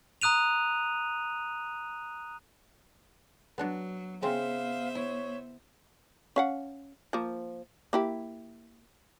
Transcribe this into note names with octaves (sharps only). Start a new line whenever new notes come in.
A#5 D#6 F#6 D#7 F7
F#3 B3 D4 F#4
C#3 B3 C4 C5 E5 F5
E4 C#5
C#4 F5 F#5
F3 A#3
A#3 E4 G4